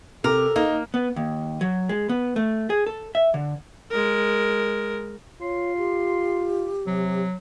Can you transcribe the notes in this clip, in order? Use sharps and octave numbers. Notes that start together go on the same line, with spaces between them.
C3 A4 A#4 D6
A#3 D#4
B3
D#2
F#3
G#3
B3
A3
G#4
A4
E5
D3
G#3 A#4
F4 C#5 C6
G4
C3 F#3